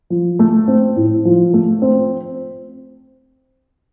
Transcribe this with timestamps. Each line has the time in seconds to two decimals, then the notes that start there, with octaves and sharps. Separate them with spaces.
0.10 F3
0.39 A3
0.68 C4
0.96 A2
1.25 F3
1.54 A3
1.82 C4